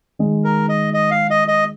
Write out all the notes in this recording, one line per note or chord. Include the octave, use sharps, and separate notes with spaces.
D#3 G#3 D#4
A#4
D#5
D#5
F5
D#5
D#5